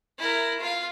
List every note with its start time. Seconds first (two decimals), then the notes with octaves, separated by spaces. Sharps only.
0.19 E4 A#4
0.60 F4 F5